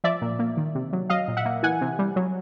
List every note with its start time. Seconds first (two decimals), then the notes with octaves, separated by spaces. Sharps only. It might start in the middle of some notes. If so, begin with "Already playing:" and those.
0.04 F3 D5 E5
0.21 A#2
0.39 A#3
0.57 D#3
0.75 C3
0.93 F#3
1.09 F#3 D#5 F5
1.28 A#2
1.37 E5 F#5
1.45 A#3
1.63 E3 F#5 G#5
1.81 C3
1.99 G3
2.16 F#3